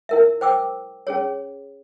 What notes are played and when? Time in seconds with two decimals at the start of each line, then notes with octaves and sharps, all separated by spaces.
0.09 E4 A#4 E5
0.41 C5 G5 D6 E6
1.07 C#4 G#4 C#5